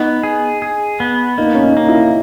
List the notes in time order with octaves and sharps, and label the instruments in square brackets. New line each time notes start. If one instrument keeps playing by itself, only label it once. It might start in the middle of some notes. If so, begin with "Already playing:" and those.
Already playing: [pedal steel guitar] B3 [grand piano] D#4
[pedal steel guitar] G#4
G#4
B3
[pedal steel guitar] A#3 [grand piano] D#4
[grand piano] C#4
D#4
[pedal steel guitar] A#3
[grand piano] E4